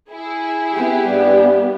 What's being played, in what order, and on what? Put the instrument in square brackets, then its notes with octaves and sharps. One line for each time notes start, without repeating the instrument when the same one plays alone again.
[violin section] E4 G#4
[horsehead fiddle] B3 G4
[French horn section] G2 G3